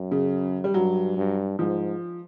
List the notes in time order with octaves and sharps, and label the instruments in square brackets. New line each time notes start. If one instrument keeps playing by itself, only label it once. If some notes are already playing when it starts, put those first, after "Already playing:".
Already playing: [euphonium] F#2
[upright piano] C#3
G3
[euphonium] G2 [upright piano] F#3
[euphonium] G2
[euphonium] G#2 [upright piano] F3